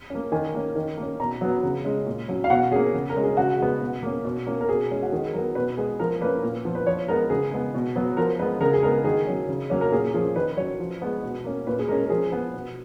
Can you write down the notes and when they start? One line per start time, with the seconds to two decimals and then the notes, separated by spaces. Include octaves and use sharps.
0.10 A#3 C#4
0.32 D#3 G#5
0.54 A#3 C#4
0.75 D#3
0.97 A#3
1.02 C#4
1.20 B2 A#5
1.41 F#3 B3
1.63 C#3
1.85 G#3 C#4
2.06 A#2
2.28 F#3 C#4
2.44 F5
2.50 B2 F#5
2.72 A#3 C#4 G#4
2.94 C#3
3.10 A#4
3.16 G#3 C#4
3.23 G#4
3.37 C#3 F#4
3.60 G#3 B3
3.81 B2
4.03 A#3 C#4
4.24 B2
4.47 A#3 C#4
4.61 A#4
4.69 B2 G#4
4.90 G#3 C#4
5.02 F#4
5.12 D#3 G#4
5.34 F#3 B3 A#4
5.55 B2 B4
5.77 G#3 B3 G#4
6.00 F3 A#4
6.21 A#3 C#4 B4
6.43 A#2
6.65 F3 B3
6.75 B4
6.86 F3 C#5
7.08 G#3 B3 A#4
7.30 C#3 G#4
7.52 G#3 B3
7.74 B2
7.96 F#3 B3
8.17 F3 A#4
8.39 G#3 B3 B4
8.61 C#3 A#4
8.73 G#4
8.82 G#3 B3 A#4
9.04 D#3 G#4
9.27 F#3 C#4
9.48 C#3
9.70 F#3 A#3 C#4
9.81 A#4
9.92 A#2 G#4
10.14 F3 A#3 C#4 G#4
10.35 D#3 B4
10.57 F#3 C#4 C#5
10.79 F3
11.02 G#3 B3
11.23 B2
11.44 A#3 C#4
11.67 A#2 B4
11.79 G#4
11.88 G#3 A#4
11.92 C#4
12.05 A#4
12.09 F3 G#4
12.32 B3
12.54 B2